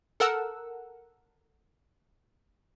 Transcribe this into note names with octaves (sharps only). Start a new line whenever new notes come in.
A4 A#4 F#5 E6